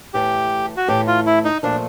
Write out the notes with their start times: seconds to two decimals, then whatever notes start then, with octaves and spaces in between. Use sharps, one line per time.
0.14 A2 E3 A3 G4
0.77 F#4
0.88 A2 E3 A3 G4
1.07 F4
1.26 E4
1.45 D#4
1.63 A#2 F3 A3 D4